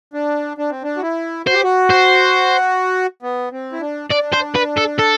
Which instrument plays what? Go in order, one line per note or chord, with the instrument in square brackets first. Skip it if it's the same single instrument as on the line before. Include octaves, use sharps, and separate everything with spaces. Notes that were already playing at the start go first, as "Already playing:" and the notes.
[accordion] D4
D4
C4
D4
F#4
E4
[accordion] F#4 [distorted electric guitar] C5
[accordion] G4
F#4
[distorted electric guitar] C5
[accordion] B3
C4
E4
D4
[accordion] D4 [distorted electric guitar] D5
[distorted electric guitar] C5
B4
A4
A4